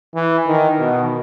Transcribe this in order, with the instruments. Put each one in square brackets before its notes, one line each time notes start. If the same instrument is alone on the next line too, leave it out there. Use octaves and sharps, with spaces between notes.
[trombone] E3
D#3
B2